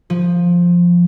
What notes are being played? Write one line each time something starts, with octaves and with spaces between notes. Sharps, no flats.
F3